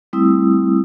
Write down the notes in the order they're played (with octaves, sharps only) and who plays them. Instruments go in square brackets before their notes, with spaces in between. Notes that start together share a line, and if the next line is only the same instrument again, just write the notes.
[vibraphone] G3 A3 C4 E4 D#6 E6